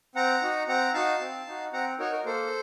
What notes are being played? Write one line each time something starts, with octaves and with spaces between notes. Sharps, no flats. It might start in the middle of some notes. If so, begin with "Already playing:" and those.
C4 F#5 A#5
D#4 F#4
C4 F#5 A#5
D#4 F#4 F5 A5
C4
D#4 F#4
C4 F#5 A#5
D#4 F#4 A#4 C#5
A#4
A#3 A4 C5